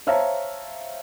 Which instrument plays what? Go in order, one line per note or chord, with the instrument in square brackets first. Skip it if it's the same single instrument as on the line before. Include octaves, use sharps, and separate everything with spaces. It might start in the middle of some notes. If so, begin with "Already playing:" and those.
[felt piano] C5 C#5 E5 F5 A5 A#5